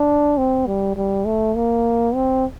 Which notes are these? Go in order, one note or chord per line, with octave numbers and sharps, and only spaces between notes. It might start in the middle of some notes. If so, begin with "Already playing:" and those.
Already playing: D4
C4
G3
G3
A3
A#3
C4